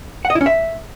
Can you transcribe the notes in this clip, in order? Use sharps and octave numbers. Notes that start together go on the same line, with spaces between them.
F#5
D#5
E4
C#4
E5